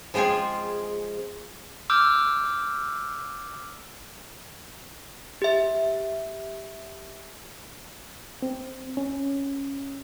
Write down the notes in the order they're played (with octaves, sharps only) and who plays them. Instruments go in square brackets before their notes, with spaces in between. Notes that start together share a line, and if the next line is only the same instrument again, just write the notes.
[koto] F3 G#3 C4 F4 G#4
[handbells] D6 E6 F6 G6
G4 E5
[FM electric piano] C4
C#4